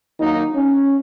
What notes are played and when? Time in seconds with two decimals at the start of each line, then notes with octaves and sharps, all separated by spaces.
0.20 D#3 F#3 A#3 D#4
0.54 C#4